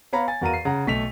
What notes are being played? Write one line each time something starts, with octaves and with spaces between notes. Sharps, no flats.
B3 C#5 F5 A#5 B5
G#5 A6
E2 F#4 A#4 F5 A#5 D#7
C7
C#3 F#5 A#5
B1 A3 B6 F7